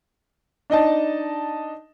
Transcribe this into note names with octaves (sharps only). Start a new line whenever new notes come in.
D4 D#4 D#5 A5